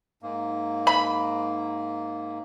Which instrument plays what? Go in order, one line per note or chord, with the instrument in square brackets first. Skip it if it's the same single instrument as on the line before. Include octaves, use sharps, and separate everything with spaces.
[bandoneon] G#2 A#3
[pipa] B5